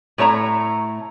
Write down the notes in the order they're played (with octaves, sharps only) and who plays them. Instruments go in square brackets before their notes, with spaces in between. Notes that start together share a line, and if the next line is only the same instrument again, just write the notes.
[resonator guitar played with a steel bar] A2 A3 C#5 A#5